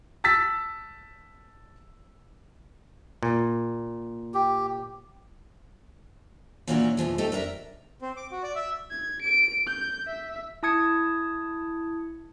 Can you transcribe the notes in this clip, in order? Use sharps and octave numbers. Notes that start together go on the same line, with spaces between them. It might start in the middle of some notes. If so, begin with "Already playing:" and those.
A5 E6 A6 B6
A#2
G4
A#2 E3 A#3 C#4 D4 F#4
B2 E3 F3 G#3
A3 C4 D#4 G4 A4
D4 A#4 C5 E5
C4
D6
F#4
D5
E5
G#6
D7
G6
E5
E4 A5 D#6 G#6 C#7